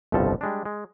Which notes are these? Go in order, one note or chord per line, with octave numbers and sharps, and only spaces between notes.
G1 C2 F2 B2 F3 A4
G3 G#3 D4
G#3